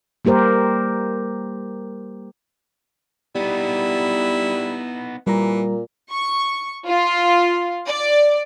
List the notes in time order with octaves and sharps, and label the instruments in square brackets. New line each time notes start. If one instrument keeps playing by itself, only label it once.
[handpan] G3 A#3 G4 A#4 C5
[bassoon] G3 [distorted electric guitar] B3 D#4 [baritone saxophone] E4
[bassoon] A#2 [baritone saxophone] E3 [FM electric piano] G3 A#5
[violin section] C#6
F4
D5